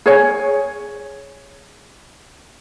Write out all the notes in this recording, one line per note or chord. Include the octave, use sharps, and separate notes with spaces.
G#4 C#5 G#5